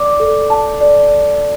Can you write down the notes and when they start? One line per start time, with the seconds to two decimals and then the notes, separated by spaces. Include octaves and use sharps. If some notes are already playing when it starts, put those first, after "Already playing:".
Already playing: D5 D6
0.20 A4
0.50 A5
0.81 D5